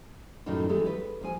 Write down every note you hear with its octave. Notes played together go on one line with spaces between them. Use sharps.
F#2 A2 C3 D#3 F#3 D#4
E3 F#3 G#3 A3 G4 A4
B4
G#2 F3 G#5